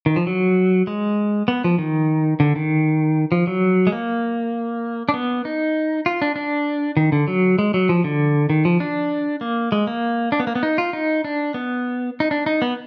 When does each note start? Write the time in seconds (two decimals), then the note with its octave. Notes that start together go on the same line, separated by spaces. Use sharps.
0.06 D#3
0.16 F3
0.27 F#3
0.87 G#3
1.48 B3
1.64 F3
1.78 D#3
2.40 D3
2.56 D#3
3.32 F3
3.47 F#3
3.87 G#3
3.92 A#3
5.09 D4
5.14 B3
5.45 D#4
6.06 F4
6.22 D4
6.36 D4
6.97 D#3
7.12 D3
7.28 F#3
7.59 G#3
7.74 F#3
7.89 F3
8.04 D3
8.50 D#3
8.65 F3
8.80 D4
9.41 A#3
9.72 G#3
9.87 A#3
10.32 D4
10.40 B3
10.47 A#3
10.55 B3
10.63 D#4
10.78 F4
10.93 D#4
11.24 D4
11.54 B3
12.20 D#4
12.31 D4
12.46 D#4
12.62 B3